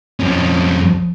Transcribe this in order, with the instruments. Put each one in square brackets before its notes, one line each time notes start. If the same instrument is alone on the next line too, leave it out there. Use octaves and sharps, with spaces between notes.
[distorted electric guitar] F2 C#4